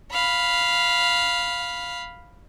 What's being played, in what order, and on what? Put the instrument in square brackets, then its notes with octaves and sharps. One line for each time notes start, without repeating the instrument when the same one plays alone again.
[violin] F5 B5